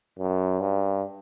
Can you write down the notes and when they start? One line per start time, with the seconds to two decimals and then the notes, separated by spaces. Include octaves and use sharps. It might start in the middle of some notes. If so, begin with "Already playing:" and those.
0.19 F#2
0.61 G2